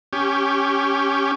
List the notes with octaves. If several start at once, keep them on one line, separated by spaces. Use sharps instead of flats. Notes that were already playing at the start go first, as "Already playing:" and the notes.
C#4 G4